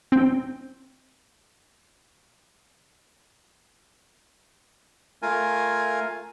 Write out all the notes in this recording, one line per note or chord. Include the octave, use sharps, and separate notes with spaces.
C4 G5
A3 F4 A#4 G#5